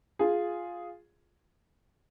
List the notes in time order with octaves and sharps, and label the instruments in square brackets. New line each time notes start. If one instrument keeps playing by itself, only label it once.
[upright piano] F4 G#4